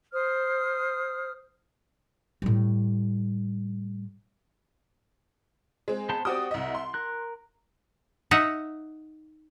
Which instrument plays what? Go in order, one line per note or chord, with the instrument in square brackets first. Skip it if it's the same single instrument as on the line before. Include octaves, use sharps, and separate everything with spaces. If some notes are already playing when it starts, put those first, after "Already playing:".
[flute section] C5 D#6 F6
[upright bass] A2 G3
[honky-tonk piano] G#3 C4
[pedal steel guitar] B3 C5 A5
[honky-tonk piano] C4 F#4 D#6 [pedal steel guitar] G4 D5
[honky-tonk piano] C2 D#5 [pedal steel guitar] E5
[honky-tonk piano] C6
[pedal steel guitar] A#4 F#6
[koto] D#4 E5 F#5